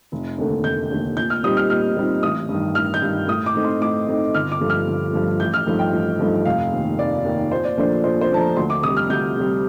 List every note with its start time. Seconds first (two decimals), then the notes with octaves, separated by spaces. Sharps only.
0.12 F1
0.38 D#2 D3 A3
0.64 F1 G6
0.91 D#2 D3 A3
1.17 A#1 G6
1.30 F6
1.43 A#2 G3 C4 D#4 D#6
1.57 F6
1.70 A#1 F6
1.97 A#2 G3 C4 D#4
2.23 A1 D#6
2.49 G2
2.54 D#3
2.75 A1 F6
2.94 G6
3.02 G2 D#3
3.28 A2 D#6
3.46 D6
3.54 A3 C4 D#4
3.64 C6
3.81 A2 D6
4.08 A3 C4 D#4
4.34 G1 F6
4.52 D6
4.60 G2 F3 A3
4.70 F6
4.88 G1
5.13 G2 F3 A3
5.40 A1 G6
5.54 F6
5.66 G2 F3 A3 D#4
5.79 G5
5.92 A1
6.19 G2 F3 A3 D#4
6.45 F1 F5
6.72 D#2 D#3
6.99 F1 D5
7.24 D#2 D#3
7.51 A#1 C5
7.65 D5
7.77 A#2 F3 A3 D4 C5
8.04 A#1 C5
8.21 C5
8.30 A#2 F3 A3 D4 A5
8.39 A#5
8.57 D2 C6
8.70 D6
8.83 C3 D#6
8.89 G3
8.97 F6
9.10 D2 G6
9.37 C3 G3